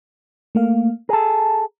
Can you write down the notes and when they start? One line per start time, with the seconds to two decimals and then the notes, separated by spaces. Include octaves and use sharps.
0.55 A3 A#3 F5
1.09 G#4 A4 A#5